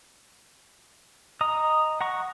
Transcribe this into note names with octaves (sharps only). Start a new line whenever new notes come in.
D#5 A#5 D#6
F#5 A#5 C#6